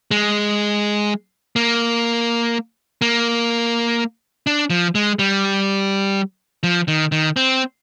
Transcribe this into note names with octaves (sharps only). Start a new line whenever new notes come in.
G#3
A#3
A#3
D4
F3
G#3
G3
F3
D#3
D#3
C4